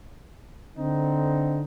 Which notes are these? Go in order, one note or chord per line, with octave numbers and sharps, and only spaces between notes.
D3 C4 D#4